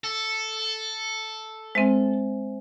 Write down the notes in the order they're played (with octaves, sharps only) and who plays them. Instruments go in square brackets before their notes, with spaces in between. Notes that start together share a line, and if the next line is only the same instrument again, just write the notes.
[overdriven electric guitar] A4
[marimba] G#3 C4 [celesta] C5 E5 G#5